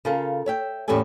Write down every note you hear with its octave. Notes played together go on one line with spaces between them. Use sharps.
C#3 F4 A4 A#4
C#5 E5 G5
E2 A2 C#4 G4 A4 G#5